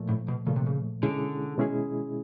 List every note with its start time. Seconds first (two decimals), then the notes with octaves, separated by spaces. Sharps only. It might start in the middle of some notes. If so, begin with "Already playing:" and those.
Already playing: A#2 F3 A3
0.09 A2
0.28 B2
0.47 A#2 C#3 F3 A3
0.56 C3
0.66 C#3
1.03 B2 D3 G#3 C#4 E4 G#4
1.58 B2 G#3 C#4 E4 G#4